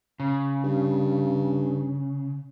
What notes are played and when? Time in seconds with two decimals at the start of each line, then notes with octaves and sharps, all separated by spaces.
0.20 C#3
0.64 G2